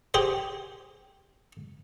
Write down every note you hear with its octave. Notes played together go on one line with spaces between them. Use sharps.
G4 G#4 C5